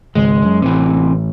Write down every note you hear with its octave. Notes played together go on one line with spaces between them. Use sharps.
G#1 C#2 G#3
F#2
A1 C3 E3